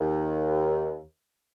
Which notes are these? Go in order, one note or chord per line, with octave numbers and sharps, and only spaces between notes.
D#2